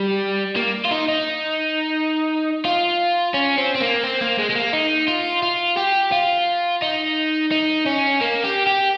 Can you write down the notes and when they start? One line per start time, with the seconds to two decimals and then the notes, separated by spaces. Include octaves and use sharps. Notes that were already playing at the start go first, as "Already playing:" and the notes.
Already playing: G3
0.57 A#3
0.85 F4
0.91 D#4
1.08 D#4
2.65 F4
3.34 C#4
3.57 C4
3.75 C4
3.80 A#3
4.04 C4
4.21 A#3
4.38 G#3
4.50 G#3
4.56 A#3
4.73 D#4
5.08 F4
5.43 F4
5.77 G4
6.12 F4
6.82 D#4
7.51 D#4
7.86 C#4
8.21 A#3
8.44 G4
8.66 G4